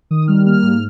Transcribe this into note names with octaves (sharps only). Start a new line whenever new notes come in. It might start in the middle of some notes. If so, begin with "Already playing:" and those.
D#3 D#6
G3 F6
A#3 F6
G#2